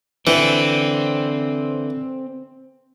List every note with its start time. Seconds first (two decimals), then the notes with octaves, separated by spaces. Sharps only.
0.27 D3 E3 C4